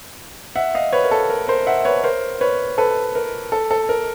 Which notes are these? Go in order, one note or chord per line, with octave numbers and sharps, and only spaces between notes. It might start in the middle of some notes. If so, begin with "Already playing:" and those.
E5 F#5
D#5 F5
B4 C#5
A#4
A4
A#4
A#4 C5
E5 F#5
B4 C#5
A#4 C5
B4 C#5
A4 B4
A#4
A4
A4
A#4